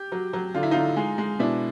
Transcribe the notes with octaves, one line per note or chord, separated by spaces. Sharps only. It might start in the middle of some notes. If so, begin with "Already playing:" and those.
Already playing: G4
F#3
F#3
D3 F4
E4
D3 D#4 F4
G#3
G#3
B2 D4 E4